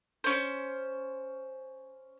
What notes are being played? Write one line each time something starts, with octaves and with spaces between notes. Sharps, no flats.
C#4 C5